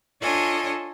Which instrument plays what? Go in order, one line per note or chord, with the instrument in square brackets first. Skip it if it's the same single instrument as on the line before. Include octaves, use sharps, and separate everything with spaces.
[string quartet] D4 F4 A4 C#5 D#5 G#5